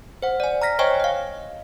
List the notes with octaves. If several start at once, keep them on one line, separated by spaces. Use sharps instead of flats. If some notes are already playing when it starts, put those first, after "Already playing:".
C5 F#5
D5 G#5
A#5 F6 A#6 B6
C5 C#5 D#5 G5 G#5 C#6
D#5 F5